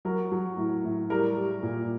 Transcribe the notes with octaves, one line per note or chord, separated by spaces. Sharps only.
F#3 A#4
F#3
A2
A2
G3 A#4
G3
A#2